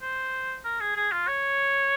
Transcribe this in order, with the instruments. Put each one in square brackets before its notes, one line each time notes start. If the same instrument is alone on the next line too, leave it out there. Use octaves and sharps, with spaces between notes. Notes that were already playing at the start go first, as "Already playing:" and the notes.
[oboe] C5
A#4
G#4
G#4
F4
C#5